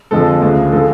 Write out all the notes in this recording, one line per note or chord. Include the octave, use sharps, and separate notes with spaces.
F2 D3 F3 G#3 A4
D2 C#3 F3 G#3
D3 F3 G#3 A4